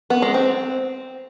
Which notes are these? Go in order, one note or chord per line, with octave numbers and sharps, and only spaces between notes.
B3
G#3
C4